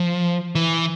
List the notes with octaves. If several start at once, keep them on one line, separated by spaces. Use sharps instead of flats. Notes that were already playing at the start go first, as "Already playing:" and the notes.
Already playing: F3
E3